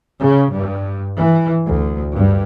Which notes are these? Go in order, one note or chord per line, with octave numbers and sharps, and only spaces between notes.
C#3
G2
E3
D2
G2